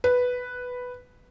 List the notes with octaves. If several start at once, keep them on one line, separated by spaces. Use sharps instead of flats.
B4